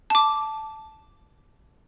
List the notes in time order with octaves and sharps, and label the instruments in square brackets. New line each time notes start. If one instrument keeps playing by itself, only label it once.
[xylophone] A5 D6